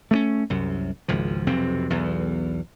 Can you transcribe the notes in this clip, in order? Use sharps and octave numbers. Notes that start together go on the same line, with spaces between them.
A3 A#3 C#4
C2 F#2
G#1 C#2 F3
B1 F2 C3 C4
B1 E2